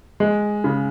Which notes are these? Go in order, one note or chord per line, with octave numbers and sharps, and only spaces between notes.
G#3
C#3